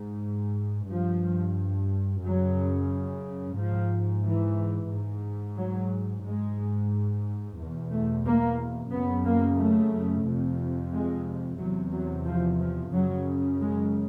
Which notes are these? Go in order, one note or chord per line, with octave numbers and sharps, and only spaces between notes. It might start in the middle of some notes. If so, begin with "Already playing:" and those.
Already playing: G#2
G2 F3
F#2 C#3 F#3
G#2 F3
E3
G#2
F#3
G#2 G#3
E2 B2
A3
A#3
F#2 C#3 B3
A#3
A3
F2 C3
G#3
E2 C3 F#3
F#3
F3
F3
F#2 C#3 F#3
G#3